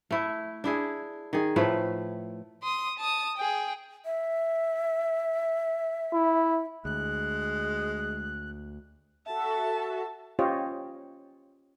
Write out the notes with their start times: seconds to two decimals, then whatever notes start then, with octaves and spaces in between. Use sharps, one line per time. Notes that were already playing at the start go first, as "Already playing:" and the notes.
0.11 A3 E4
0.64 D4 E4 G#4
1.33 D#3 G#4
1.56 A2 F3 A3 B4
2.63 C6 D#6
2.99 A5 D#6
3.37 G#4 G5
4.05 E5
6.12 E4
6.85 D2 G#3 F#6
9.26 F#4 A4 E5 A5
10.39 C#4 F4 G4 C5 C#5 D#5